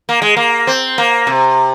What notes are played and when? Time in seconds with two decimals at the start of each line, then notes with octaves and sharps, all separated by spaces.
0.09 A#3
0.22 G#3
0.36 A#3
0.67 C4
0.98 A#3
1.27 C3